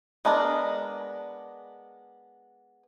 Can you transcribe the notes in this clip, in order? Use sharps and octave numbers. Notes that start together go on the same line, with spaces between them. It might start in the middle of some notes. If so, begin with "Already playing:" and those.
G#3 B3 D4 A#4